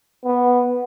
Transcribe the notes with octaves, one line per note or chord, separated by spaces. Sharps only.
B3